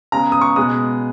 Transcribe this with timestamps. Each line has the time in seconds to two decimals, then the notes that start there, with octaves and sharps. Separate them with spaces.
0.12 C#3 G#3 B3 A#5
0.32 D#6
0.41 C#6
0.56 B2 G#3 B3 D#6